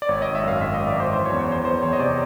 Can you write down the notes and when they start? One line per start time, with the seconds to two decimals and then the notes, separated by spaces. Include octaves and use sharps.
0.02 D5
0.09 G#1 C#5
0.22 D#5
0.27 G#1
0.35 E5
0.43 F#2 F5
0.61 G#1 E5
0.74 D#5
0.78 G#1
0.87 D5
0.95 F#2 C5
1.13 E3 C5
1.26 C#5
1.30 E2
1.39 C#5
1.48 E3 C5
1.65 E2 C5
1.82 E2 C#5
1.93 D#5
1.99 C3 D5